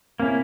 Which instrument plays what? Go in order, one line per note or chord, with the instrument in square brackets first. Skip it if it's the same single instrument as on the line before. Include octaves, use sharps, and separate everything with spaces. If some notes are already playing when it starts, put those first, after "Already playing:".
[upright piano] C3 [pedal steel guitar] A#3 C#4 E4